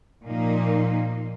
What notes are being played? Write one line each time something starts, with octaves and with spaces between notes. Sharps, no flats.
A#2 F3 A#3 D#4